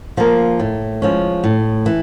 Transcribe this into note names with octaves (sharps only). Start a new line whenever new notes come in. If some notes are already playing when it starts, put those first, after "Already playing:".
F3 A#3
A2
F3 G#3 C#4
A2
E3